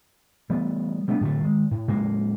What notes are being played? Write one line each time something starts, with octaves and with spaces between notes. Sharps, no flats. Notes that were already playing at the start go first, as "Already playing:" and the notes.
E3 G3 A3 B3
G3 A3 B3 D4
A2 D3 G3 A3
D#3 G#3
A2
A2 C#3 G#3 A#3